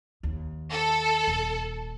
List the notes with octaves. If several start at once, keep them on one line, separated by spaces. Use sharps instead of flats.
D#2
A4
D#1